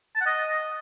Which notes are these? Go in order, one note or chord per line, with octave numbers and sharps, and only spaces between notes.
A5
F#5
D#5